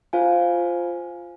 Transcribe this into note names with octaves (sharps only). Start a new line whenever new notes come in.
F4 C5 F5 G#5